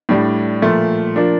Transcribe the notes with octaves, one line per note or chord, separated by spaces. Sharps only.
A2 G3 D4
A#2 F3 A3
F3 A#3 D4